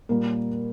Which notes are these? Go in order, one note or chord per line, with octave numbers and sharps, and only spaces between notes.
A#2 G3 A#3 A#4